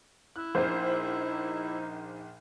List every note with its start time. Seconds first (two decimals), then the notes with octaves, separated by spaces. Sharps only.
0.36 E4 F#6
0.55 A#1 A#2 D#4 C5